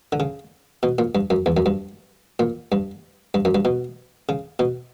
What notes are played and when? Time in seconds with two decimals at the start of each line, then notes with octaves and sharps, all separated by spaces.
0.12 D3
0.20 C#3
0.83 B2
0.99 A#2
1.15 G2
1.30 F#2
1.46 E2
1.57 F#2
1.66 G2
2.39 A#2
2.72 G2
3.34 G2
3.45 F#2
3.55 G2
3.65 B2
4.29 C#3
4.59 B2